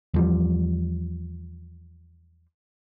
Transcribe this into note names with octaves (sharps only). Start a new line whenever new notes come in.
E2 F3 G3